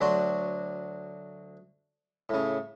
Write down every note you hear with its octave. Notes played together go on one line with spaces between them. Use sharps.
D2 F#3 D4 F#4 C6
A2 C#3